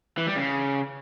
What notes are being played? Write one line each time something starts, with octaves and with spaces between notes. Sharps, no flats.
E3
G3
C#3